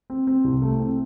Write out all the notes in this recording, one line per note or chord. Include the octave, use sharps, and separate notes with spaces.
C4
C4
C2
A3
C4